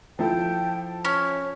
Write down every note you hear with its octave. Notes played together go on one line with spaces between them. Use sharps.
F3 E4 A4 G5
C#4 C#5